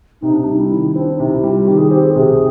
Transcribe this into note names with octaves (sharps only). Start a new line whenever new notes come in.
C3 D#4
D4
G3 D#4
E4
D#3
C4 D4
D#4
C3
E4
G3
F4
D#3 G4
G#4
C4 G4
G#4
A4
C3 G#4